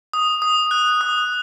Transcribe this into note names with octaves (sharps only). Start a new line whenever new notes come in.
D#6
D#6
F#6
D#6